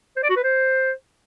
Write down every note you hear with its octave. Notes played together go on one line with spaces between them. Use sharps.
C5
D5
F#4
B4
C5